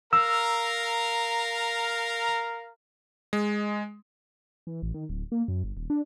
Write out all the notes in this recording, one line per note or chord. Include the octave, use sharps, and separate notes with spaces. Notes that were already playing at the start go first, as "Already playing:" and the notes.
A#4 F5 A#5 E6
G#3
E3
A1
D#3
D1
A#3
F#2
G1
D#1
D4